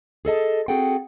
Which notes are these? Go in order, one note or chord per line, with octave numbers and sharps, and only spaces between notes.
G#4 A4 D#5 A5
C4 F#4 G#4 A4 F#5 G5